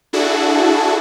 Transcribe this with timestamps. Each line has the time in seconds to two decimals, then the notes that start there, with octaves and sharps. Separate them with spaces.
0.13 D4 E4 F#4 G#4 A4